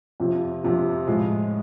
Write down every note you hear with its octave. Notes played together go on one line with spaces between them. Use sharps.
F2 C3 F3
F2 C3 F3
A2 F3 G#3